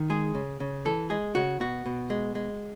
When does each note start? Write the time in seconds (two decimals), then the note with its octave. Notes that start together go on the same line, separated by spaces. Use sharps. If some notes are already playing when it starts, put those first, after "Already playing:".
Already playing: D#3
0.10 G#3 G#4
0.35 C#3
0.60 C#3
0.85 E3 A4
1.10 G#3 G#4
1.35 C#3 F#4
1.60 B2 F#4
1.86 B2
2.10 G#3
2.35 G#3